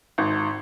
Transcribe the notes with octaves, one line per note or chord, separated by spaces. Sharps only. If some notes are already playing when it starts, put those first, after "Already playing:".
G#1